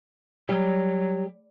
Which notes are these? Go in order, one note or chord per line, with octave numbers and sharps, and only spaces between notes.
F#3 G3